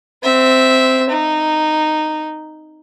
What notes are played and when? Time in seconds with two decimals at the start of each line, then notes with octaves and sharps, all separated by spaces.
0.24 C4 E5
1.10 D#4